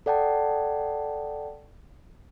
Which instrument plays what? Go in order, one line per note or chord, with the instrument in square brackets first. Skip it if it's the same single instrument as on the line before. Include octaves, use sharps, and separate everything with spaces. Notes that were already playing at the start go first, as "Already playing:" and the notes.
[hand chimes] A4 D5 F#5 G5 A5